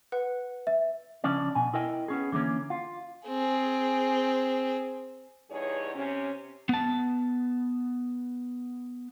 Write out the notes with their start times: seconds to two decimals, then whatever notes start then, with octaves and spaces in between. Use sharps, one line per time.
0.12 B4 F#5
0.67 E5
1.24 C#3 F3 C#4 D4 D5
1.55 B2 G#5
1.74 E4 A#4 D#5 G5
2.08 B3 C#4 G#4
2.32 D3 E3 A#3 C#4
2.70 F4
3.27 C4 G#4
5.50 E2 G2 D#4 G#4 C#5
5.95 C3 C#4
6.69 B3 A5